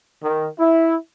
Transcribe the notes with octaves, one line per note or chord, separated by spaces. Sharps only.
D#3
E4